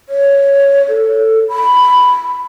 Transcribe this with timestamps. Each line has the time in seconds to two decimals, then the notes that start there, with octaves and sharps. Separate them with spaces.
0.09 C#5
0.89 A4
1.49 B5